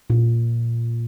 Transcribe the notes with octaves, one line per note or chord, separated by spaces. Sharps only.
A#2